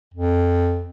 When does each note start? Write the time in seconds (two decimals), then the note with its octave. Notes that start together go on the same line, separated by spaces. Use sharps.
0.14 F2